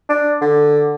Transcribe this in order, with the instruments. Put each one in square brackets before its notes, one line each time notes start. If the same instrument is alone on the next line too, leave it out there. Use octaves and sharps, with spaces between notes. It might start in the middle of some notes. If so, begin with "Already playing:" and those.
[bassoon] D4
D3